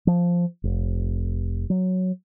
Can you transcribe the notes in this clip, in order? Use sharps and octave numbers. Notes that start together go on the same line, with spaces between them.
F3
F1
F#3